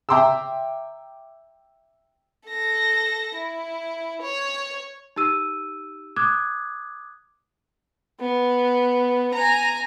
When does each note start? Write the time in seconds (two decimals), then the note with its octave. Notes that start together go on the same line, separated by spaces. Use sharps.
0.09 E5 G5 A#5 C6 D6 E6
2.48 A4 A#6
3.35 E4
4.22 C#5
5.16 D#4 G4 E6 D#7
6.16 D6 D#6 F#6 G#6
8.21 B3
9.34 G#5 A#5